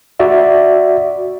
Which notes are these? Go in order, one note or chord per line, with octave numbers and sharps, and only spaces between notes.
F#4 D5 E5